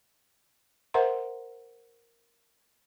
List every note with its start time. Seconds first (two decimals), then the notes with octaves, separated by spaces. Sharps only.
0.94 A#4 C5 E5 F#5 A#5 C6